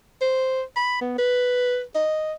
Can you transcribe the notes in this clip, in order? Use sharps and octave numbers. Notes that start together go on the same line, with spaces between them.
C5
B5
B3
B4
D#5